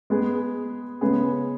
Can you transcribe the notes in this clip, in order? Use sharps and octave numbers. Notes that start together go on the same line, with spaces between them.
G#3 B3 G#4
C#3 G#3 B3 G#4